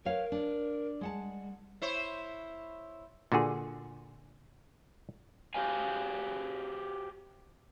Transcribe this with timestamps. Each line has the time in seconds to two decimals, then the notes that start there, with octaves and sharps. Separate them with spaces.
0.05 A#4 B4 C#5 F5
0.32 D4
1.01 G3 G#3 F#5 A5
1.82 E4 C5 C#5
3.32 A#2 D3 F#4 G#4
5.54 F#4 G4 C5 F5 G#5